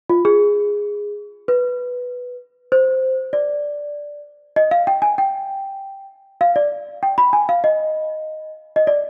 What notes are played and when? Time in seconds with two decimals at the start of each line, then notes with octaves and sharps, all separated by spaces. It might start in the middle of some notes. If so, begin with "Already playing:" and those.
0.09 F4
0.25 G#4
1.48 B4
2.72 C5
3.33 D5
4.56 D#5
4.71 F5
4.87 G5
5.02 G#5
5.18 G5
6.41 F5
6.56 D5
7.03 G5
7.18 B5
7.33 G#5
7.49 F5
7.64 D#5
8.76 D#5
8.87 D5